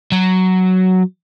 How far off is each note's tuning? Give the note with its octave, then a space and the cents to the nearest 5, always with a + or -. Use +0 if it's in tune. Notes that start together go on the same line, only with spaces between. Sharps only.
F#3 +5